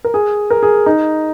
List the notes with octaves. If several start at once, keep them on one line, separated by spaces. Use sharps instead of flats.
A#4
G#4
A#4
G#4
D#4